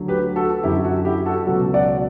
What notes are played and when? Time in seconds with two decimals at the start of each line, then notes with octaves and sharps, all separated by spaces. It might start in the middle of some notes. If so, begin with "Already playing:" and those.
Already playing: D2 D3 F#3
0.08 G4 B4
0.36 F#4 A4
0.63 F#2 D3 F#3 E4 G4
0.85 F#4 A4
1.05 E4 G4
1.26 F#4 A4
1.47 C#2 B2 F#3 F#4 A4
1.74 D5 F#5